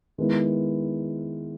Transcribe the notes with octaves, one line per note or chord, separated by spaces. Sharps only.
D#3 G#3 B3 E4